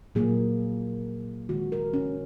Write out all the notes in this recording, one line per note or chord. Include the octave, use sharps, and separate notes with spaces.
A#2 F#3 A#3 G#4
D#3 G#3 F#4
A#4
C#4